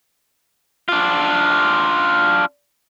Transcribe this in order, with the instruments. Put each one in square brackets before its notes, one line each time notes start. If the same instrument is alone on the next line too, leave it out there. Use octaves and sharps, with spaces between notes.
[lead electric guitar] D4 F4